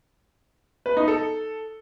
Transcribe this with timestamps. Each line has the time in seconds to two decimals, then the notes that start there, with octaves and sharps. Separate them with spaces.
0.86 B4
0.97 D#4
1.08 A4